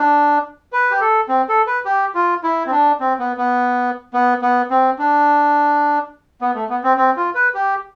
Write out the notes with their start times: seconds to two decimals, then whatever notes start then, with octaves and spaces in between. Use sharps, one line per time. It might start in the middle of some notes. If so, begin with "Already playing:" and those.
Already playing: D4
0.73 B4
0.91 G4
1.01 A4
1.29 C4
1.49 A4
1.67 B4
1.85 G4
2.15 F4
2.43 E4
2.66 C4
2.72 D4
3.00 C4
3.19 B3
3.37 B3
4.14 B3
4.42 B3
4.70 C4
4.99 D4
6.41 B3
6.54 A3
6.69 B3
6.84 C4
6.97 C4
7.17 F4
7.35 B4
7.54 G4